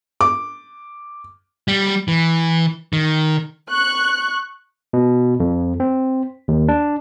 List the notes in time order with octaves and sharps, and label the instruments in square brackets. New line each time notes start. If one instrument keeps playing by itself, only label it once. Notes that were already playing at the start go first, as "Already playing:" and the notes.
[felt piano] D6
[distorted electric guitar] G3
E3
D#3
[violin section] C#6 F#6
[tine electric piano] B2
F2
C4
D#2
D4